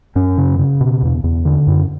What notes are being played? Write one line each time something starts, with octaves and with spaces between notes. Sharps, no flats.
F#2 C#4
C#3
C#3
B2
E2
E2
D3
F#2